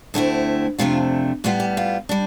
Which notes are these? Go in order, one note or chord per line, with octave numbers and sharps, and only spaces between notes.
D2 D3 A3 C4 E4
F2 C3 F3 A3 D4 F4
A2 G3 B3 F4
G4
F4
G3 D4